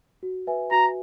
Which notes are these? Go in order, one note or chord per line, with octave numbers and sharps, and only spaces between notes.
F#4
B4 E5 G#5
F#4 A#5